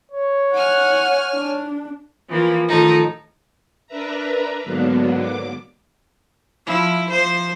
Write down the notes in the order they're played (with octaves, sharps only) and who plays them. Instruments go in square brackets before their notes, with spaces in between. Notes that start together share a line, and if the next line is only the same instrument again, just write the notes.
[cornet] C#5
[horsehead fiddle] F#5 [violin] G#5 F6
[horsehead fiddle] D4
[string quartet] E3 F3 A#3
A2 D#3 F3 D#4 A4
[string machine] D4 A#4 B4 E5 A#5
G#2 D3 F#3 A#3 B3 D4
D6
[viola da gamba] F3 E4
F3 C5